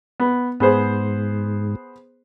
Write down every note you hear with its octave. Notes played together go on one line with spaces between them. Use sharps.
B3
G#2 B3 G#4 C5